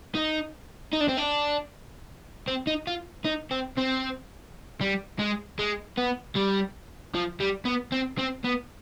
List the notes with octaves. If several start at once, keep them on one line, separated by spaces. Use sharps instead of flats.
D#4
D#4
D4
C4
D4
C4
D#4
F4
D#4
C4
C4
G3
G#3
G#3
B3
G3
F3
G3
B3
C4
C4
B3